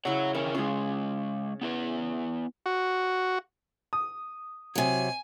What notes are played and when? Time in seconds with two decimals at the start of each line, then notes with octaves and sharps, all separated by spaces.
0.05 C#3 E4 C#5 F#5
0.35 D#3 E3 C#4 A#4
0.55 G#3 C#4 F4 G#4
1.61 B3 E4 B4
2.66 F#4
3.93 D#6
4.75 C3 F#3 G#5